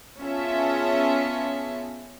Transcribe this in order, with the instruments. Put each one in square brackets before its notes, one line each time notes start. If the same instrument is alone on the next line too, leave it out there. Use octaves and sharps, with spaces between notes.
[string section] B3 C#4 F4 G#4 E5 A5